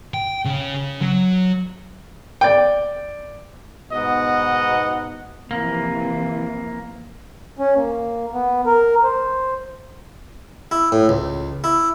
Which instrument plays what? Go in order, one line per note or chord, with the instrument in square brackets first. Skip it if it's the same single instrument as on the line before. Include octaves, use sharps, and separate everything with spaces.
[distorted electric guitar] G5
C#3
F#3
[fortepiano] D5 G5
[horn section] G#2 B2 B3 D#4 D#5 F#5
[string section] C3 E3 F3 [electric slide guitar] A#3
[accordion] C#4
A#3
B3
A#4
C5
[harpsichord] E4
A2
C#2
E4